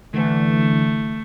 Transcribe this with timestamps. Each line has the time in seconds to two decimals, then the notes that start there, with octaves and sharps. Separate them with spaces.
0.14 D3 E3 A3